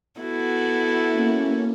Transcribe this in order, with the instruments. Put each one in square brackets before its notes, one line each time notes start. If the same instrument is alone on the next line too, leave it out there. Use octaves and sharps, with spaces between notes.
[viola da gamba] B3 F#4 A4 [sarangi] E4
[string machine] A#3 C#4